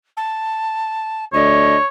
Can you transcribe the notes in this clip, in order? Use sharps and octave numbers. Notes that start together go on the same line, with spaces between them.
A5
D2 A3 D4 C#5 D#5